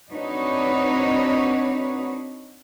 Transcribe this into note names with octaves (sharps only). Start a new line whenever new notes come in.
C4 D4 D#4 F#4 B4 C#5